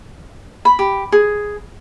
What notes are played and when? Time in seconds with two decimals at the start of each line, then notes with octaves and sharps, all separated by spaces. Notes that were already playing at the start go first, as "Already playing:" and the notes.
0.65 B5
0.79 G4
1.12 G#4